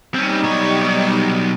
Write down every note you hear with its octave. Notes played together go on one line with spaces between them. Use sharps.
G3 C4 C#4 D#4
B1 C#5